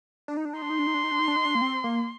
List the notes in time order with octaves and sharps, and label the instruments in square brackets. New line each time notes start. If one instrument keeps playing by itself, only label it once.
[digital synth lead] D4
D#4
D4
D#4
[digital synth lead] D4 [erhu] C6
[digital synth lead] D#4
D4
D#4
D4
D#4
D4
D#4
D4
D#4
D4
A#3
C4
A#3